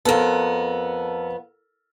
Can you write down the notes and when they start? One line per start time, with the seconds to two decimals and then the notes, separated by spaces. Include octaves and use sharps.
0.05 F2 B3 A4 A#4 A#5